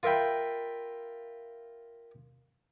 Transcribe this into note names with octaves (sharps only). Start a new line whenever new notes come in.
F4 A#4 E5 G5 B5